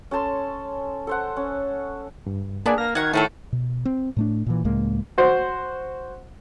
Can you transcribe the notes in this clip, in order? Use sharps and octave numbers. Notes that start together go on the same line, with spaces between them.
C#4 A4 A5 C6
A4 C5 F#5
C#4
G2
A#3 B3 D4 G#4 D5 G#5
A#3 F6 A#6
D#3 F#4 F#5 G#6
A2 D#3 A3 F#4 A4
B2
C4
A2 A3 D4
A#2 E3
C#2 A2 G#3 A#3
F#4 C5